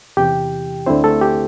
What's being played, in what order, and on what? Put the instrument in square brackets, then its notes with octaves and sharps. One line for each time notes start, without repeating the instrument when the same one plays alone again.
[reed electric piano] E2 C3 E3 G4 G5
D2 D3 C4 E4 C5
A3 A4
G4